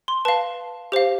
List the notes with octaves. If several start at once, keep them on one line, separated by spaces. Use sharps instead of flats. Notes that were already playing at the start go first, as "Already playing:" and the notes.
C6
B4 F5 A5
G4 C5 F5